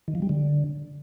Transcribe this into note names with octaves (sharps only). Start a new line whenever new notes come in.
D#3
F3
G3
D3